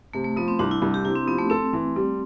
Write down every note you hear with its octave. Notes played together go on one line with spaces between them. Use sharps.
C3 A3
A3
F3 B3
C4
C2 D4
E4
C2
G4
C3 E4
C4
F3 B3
A3
C4 A4
E3
G3